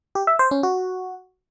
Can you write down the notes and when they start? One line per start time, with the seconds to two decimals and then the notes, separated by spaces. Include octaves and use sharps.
0.15 G4
0.27 E5
0.39 C5
0.51 C#4
0.63 F#4